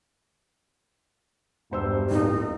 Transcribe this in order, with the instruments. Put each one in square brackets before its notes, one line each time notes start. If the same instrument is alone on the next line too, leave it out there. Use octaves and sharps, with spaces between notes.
[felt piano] E1 C5 E6 [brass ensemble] G2
[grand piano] D1 [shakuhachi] D#4